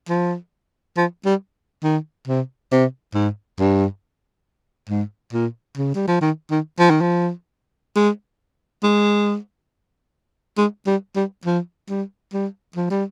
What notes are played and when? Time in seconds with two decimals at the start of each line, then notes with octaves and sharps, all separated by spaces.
0.09 F3
0.97 F3
1.25 G3
1.84 D#3
2.27 C3
2.72 C3
3.14 G#2
3.59 G2
4.89 G#2
5.33 A#2
5.77 C#3
5.95 G3
6.07 F3
6.21 D#3
6.51 D#3
6.79 F3
6.90 D#3
7.01 F3
7.96 G#3
8.83 G#3
10.57 G#3
10.87 G3
11.16 G3
11.45 F3
11.89 G3
12.33 G3
12.76 F3
12.90 G3